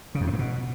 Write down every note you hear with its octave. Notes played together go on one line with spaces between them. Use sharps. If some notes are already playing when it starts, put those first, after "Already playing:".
C#3
F2
C3
G2
B2